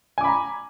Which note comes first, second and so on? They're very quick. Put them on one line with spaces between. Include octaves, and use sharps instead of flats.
G#5 D6 B5 A#5